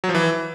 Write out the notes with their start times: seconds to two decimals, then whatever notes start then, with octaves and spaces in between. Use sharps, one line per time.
0.04 F#3
0.09 F3
0.15 E3